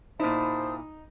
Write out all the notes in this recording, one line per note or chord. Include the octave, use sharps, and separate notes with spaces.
A#2 D#4 E4 C5 A5 D#6